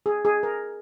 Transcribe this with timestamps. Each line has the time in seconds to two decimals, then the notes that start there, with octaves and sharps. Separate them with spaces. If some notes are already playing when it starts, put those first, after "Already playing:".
0.06 G#4
0.25 G#4
0.43 A#4